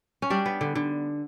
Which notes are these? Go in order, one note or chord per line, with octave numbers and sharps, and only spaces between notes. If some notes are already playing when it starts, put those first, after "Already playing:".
C#4
G3 D4
B3
D3
D3